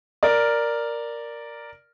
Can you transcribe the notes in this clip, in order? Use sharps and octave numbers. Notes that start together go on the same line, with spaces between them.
A#4 D5